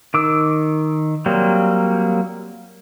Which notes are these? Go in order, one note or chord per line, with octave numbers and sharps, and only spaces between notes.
D#3 D6 E6
F#3 G3 A#3 C4